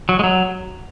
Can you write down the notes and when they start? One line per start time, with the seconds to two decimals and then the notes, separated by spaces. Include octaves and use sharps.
0.09 F#3
0.19 G#3
0.24 F#3